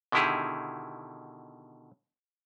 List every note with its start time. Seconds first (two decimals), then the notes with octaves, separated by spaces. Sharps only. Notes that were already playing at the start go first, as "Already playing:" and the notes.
0.12 B2 D3 D#3 E4 G4 G#4